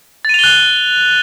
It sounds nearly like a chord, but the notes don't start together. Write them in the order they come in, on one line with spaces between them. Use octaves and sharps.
A6 D#7 F7 G7 F#6